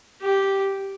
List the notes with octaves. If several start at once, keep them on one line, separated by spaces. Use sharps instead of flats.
G4